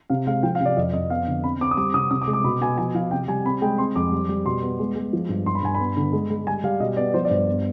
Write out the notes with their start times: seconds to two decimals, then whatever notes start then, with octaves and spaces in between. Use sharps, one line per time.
0.10 C3 F5
0.27 G#3 F5
0.43 F3 G5
0.55 F5
0.60 C3
0.66 D5
0.77 F2 D#5
0.93 F2 D#5
1.10 B3 F5
1.27 D3
1.44 C4 B5
1.61 C4 D6
1.71 D#6
1.77 G3 D6
1.94 C3 D#6
2.11 C3 D#6
2.22 D6
2.27 G#3
2.33 D6
2.44 B2 B5
2.61 B2 G#5
2.78 F3 G#5
2.95 F3 F5
3.11 C3 G5
3.28 G3 G#5
3.45 C4 B5
3.62 G#3 G5
3.78 C4 C6
3.96 F2 D6
4.12 G3
4.29 G3
4.45 B2 C6
4.62 B3
4.79 G#3
4.96 G#3
5.13 F3
5.29 G2
5.46 G2 C6
5.55 B5
5.63 G2 G#5
5.75 B5
5.80 B3
5.97 D3
6.13 G#3
6.30 G#3
6.47 G3 G#5
6.64 G3 F5
6.80 B2 D#5
6.97 B3 D5
7.14 F3 C5
7.25 D5
7.30 G2
7.36 D5
7.47 B3